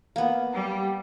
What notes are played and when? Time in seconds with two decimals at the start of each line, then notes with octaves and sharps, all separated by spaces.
0.16 A#3 B3
0.53 G3